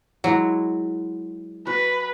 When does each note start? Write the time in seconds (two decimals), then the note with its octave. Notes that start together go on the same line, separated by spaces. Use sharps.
0.24 F#3 G#3 E4 F#4
1.67 F#4 B4